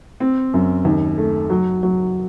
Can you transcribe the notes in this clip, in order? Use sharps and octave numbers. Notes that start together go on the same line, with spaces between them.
C4
F#2
D#2
A3
F#3
F#3